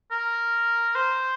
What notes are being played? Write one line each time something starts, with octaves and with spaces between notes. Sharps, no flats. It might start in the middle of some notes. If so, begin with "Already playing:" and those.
A#4
C5